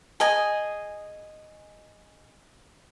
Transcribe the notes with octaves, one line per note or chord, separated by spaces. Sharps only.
G#4 D#5 G#5